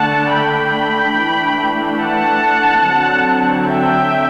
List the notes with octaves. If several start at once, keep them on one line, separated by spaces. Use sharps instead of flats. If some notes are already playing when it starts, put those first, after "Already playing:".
Already playing: D3 A3 D4 F#5 A5
G5 B5
E3 A3 D4
F#5 A5
D3 F#3 C4
E5 G5